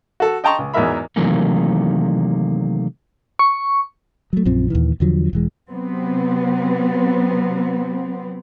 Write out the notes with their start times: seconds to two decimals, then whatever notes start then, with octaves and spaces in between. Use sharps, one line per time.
0.20 F#4 A4
0.44 D#5 G5 A5 A#5 C6 C#6
0.58 C#2
0.74 E2 G#2 F#3 A#4 E5 B5
1.16 C3 D#3 E3 F#3 A3 A#3
3.39 C#6
4.33 F#3 A3
4.45 A#1 F#2 F3 C4
4.70 D#2 A#2 D#3 E3
5.00 E2 D3 F3 F#3
5.33 E1 E3 G#3
5.69 C3 F#3 B3 C4